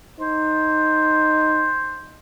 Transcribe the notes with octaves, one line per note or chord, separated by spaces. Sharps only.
D#4 C5